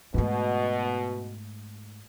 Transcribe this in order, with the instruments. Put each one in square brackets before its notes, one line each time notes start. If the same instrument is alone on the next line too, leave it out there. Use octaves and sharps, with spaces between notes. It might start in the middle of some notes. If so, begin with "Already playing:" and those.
[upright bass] G#2 A3 [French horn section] B2